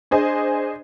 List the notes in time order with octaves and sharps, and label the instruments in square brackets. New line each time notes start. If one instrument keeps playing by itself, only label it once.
[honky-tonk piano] D4 G#4 C5 D#5